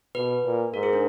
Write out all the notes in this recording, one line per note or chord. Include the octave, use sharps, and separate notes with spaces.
B2 B4
A#2
G#2 A#4
G#4
D4